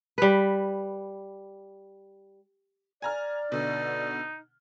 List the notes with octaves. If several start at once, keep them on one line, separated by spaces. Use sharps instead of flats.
G3 B4
D5 G#5 A#5 F6
B2 D3 D#4